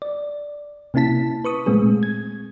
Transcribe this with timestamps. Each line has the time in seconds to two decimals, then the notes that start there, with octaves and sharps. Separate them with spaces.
0.02 D5
0.94 C3 A#3 C#4 E4 A5 B6
1.45 B4 C#6 D#6
1.66 A#2 G#3 A3 C4 G#4
2.03 G#6